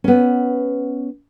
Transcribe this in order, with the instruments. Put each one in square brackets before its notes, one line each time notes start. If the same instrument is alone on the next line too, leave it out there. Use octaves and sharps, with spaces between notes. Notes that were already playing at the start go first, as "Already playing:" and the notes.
[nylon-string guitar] B3 C#4